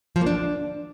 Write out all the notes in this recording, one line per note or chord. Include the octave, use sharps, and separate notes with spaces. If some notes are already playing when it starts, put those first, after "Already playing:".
F3
A#3
D4